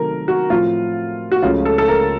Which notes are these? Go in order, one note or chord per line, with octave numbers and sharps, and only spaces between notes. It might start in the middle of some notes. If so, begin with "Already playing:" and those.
Already playing: C3 D#3 F#3 A3 A#4
F#4
A2 F3 C4 F4
F#4
C#2 C#3 F3 A3 C#4 F4
A4
A4
A#4